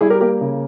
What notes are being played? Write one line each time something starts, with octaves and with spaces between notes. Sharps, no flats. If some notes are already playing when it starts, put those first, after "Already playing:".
G3 E4 G#4
G4 A#4
A#3 G4 A#4
C#3